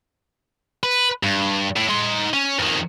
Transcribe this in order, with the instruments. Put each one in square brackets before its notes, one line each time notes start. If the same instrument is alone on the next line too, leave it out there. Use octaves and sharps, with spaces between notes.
[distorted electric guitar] B4
G2
A2
D#4 C6
C#4
F2 D#3